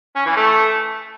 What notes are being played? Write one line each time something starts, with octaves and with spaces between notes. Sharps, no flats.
C#4
E3
A3